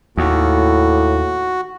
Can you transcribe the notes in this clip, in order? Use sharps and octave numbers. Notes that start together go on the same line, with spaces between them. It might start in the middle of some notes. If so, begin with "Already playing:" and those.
D#2 A2 F#4